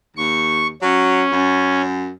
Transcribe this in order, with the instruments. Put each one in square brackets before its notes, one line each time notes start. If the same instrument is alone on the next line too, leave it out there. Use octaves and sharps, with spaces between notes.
[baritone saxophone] D#2 [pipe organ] C#6
[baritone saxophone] F#3 [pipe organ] C#4
[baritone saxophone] F#2